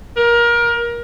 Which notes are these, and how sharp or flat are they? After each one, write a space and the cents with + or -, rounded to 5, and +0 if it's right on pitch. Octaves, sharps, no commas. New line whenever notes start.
A#4 +25